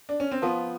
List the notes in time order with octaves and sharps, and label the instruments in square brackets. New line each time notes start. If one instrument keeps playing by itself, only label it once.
[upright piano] D4
C#4
C4
[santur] F3 [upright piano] B3